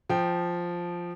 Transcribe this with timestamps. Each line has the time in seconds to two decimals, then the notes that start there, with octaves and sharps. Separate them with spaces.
0.09 F3 G5